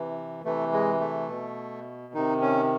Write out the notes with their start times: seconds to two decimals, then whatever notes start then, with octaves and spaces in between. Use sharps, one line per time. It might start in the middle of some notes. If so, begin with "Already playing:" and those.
Already playing: C3 E3
0.44 C3 E3 A3
0.72 G#3
1.01 A3
1.29 B2
2.14 C3 D#3 D#4
2.42 C#4